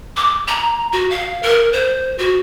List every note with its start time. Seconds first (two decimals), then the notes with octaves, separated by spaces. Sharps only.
0.17 D6
0.48 A#5
0.92 F#4
1.10 F5
1.43 A#4
1.73 C5
2.18 F#4